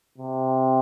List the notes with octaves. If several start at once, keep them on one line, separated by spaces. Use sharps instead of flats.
C3